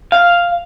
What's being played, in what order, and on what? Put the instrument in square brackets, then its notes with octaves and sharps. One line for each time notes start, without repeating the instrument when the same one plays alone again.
[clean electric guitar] F5